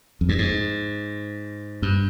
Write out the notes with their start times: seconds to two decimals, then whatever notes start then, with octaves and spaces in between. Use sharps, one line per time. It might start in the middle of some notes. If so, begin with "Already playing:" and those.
0.21 F2
0.29 G2
0.38 G#2
1.82 G2